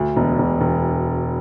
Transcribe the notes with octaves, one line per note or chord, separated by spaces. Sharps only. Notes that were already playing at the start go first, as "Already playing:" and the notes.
Already playing: D2
E1
E1
E1